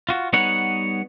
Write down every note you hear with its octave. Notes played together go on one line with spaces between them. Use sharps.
F4 F#4
G3 B3 D#4 B4 C#5 F#5